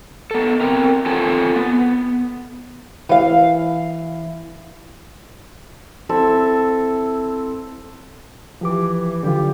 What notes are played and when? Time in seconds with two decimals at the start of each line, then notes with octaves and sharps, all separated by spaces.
0.31 B3 A4
0.60 C4 A#4
1.06 C4 F4 A4 C#5 F#5 G#5
1.56 B3
3.09 E3 F5
6.09 C4 E4 A4 E5
8.61 E3 F3 G4 D6
9.23 D3 F#3 F4 G4